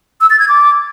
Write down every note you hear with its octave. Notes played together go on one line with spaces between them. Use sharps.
E6
A6
G#6
D6